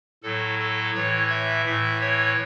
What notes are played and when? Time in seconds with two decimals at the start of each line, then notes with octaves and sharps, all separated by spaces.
0.23 A2 F#3 A4
0.59 A4
0.95 A2 E3 C#5
1.30 E5
1.65 A2 E3 E5
2.01 C#5